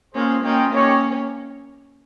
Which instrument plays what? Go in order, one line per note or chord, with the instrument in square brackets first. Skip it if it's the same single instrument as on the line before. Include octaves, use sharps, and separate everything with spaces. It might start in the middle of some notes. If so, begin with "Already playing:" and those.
[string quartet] A#3 C#4 [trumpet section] C4 F4 G#4 C5
[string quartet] A#3 C#4 [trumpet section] F4 A#4 D#5 G5
[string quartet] A#3 C#4 [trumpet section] D#4 G4 C#5 G5